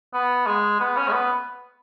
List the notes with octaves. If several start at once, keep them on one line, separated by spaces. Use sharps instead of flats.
B3
G#3
B3
C#4
G#3
B3